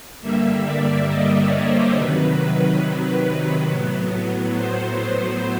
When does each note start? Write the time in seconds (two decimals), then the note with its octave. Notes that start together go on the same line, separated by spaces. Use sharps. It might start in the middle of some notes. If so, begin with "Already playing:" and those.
0.22 G2 D3 G3 A#3 E5
0.65 D5
1.08 D#5
1.38 C#5
1.67 C5
1.96 C3 D#3 F#3 B4
3.69 A2 F#3 B3
4.56 C5